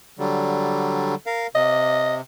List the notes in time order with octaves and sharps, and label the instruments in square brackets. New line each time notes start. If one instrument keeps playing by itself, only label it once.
[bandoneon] D3 F#3 G3
A#4 F5
[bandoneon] C3 [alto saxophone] D#5